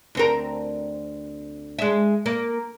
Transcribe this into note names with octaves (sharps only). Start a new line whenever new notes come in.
D2 C4 A#4
G#3 E5
A#3